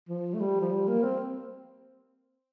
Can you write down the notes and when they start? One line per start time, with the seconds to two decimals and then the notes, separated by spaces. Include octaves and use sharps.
0.09 F3
0.34 A3
0.40 G3
0.61 F3
0.72 G3
0.88 A#3
1.04 C4